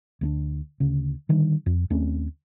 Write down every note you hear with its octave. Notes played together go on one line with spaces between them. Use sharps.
D2 A#3 D4
D2 C#3
D3 D#3 G3
F2
D#2 A3 C4 C#4